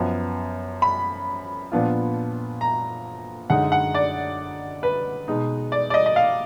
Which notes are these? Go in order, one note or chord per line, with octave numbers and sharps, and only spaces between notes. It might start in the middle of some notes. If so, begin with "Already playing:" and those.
Already playing: F#2 F3 B3
B5
A#2 F3 B3 D4 F4
A#5
F#2 D3 G#3 D#4 F#5
F#5
D5
B4
B2 G#3 D#4
D5
D5
D#5
D#5
F5